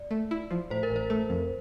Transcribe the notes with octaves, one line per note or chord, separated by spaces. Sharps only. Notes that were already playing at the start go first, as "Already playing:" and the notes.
Already playing: D5
A3
E4
F3
A2 C5
A#4
A1
C5
A3
F2